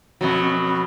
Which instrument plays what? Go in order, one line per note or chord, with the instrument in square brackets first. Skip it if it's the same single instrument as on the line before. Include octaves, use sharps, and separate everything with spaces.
[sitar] F2 B2 F#3